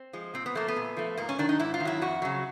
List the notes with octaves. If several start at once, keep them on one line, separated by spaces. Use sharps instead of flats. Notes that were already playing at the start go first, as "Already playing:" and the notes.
Already playing: C4
F3 G#3
A#2 C4
B3
F3 A3 A#3
B3
A#2
F3 A3
G#2 A#3
C#4
D#3 F#3 D4
D#4
G#2 E4
F4
D#3
F#3 E4
F2 F#4
C#3 F#3